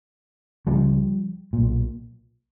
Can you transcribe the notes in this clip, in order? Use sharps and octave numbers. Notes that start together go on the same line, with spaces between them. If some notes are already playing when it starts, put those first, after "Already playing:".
C#2 C#3 F3 G3
B1 A#2